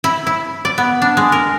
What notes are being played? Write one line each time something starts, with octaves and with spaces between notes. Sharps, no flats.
E4
E4
D5
B3
D4
G#3
A#4